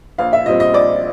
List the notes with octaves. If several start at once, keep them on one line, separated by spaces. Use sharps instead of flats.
A#1 F5
E5
A#2 G3 C4 D#5
D#5
A#1 D5